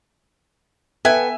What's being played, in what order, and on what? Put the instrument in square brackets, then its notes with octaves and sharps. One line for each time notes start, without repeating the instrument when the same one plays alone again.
[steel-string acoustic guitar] B3 [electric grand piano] A4 G5 F#6 [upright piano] E5 [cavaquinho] G#5